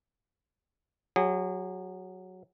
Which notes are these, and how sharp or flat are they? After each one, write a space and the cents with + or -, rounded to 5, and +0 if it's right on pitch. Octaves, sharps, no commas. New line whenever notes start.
F#3 +0 G#4 -30